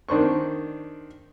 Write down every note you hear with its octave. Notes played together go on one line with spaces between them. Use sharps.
D#3 D4 C5 C#6